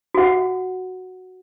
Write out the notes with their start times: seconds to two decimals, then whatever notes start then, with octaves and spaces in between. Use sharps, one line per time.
0.15 F#4 F#5